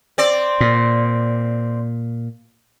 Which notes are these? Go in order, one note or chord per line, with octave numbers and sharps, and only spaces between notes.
C4 D5
A#2